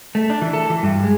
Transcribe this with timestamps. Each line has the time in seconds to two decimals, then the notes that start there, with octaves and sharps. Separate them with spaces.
0.15 A3
0.30 D4
0.42 E3
0.53 A4
0.70 E3
0.83 G2
1.03 G#3